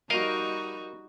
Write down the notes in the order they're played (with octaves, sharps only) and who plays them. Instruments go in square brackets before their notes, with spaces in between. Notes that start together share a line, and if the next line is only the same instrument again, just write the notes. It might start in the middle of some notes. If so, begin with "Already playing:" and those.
[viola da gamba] G3 D#4 F#4 [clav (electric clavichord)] A#4 D#5 F5